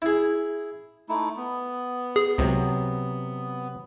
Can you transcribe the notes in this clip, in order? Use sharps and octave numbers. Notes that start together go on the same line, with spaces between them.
E4 G#4
A3 D#4 E4
B3
G#4
C#2 C3 F#3